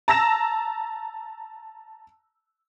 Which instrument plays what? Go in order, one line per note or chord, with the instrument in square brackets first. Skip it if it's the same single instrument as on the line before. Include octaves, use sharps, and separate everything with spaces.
[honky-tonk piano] A5 A#5 E6 A#6 E7